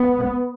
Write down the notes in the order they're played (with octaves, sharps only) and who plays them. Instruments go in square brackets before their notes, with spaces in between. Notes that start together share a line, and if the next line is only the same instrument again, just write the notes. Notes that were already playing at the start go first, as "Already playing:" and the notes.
Already playing: [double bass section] B3